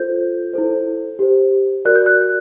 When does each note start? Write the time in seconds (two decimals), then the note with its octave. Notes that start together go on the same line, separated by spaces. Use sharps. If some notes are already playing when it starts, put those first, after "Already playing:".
Already playing: F4 A4 C5 G6
0.53 E4 A4 C5
1.19 G4 C5
1.85 F#4 A#4 D5 F#6
1.96 G6
2.06 F#6